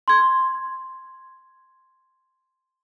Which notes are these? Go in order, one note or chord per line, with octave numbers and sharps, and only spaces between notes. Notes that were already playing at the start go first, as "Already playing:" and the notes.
C6 G#6